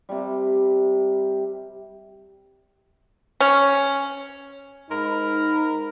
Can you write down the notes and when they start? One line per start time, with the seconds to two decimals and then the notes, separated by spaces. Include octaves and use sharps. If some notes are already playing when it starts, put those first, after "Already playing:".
0.09 C3 G3
3.40 C#4
4.90 G#2 D#4 A#4 B5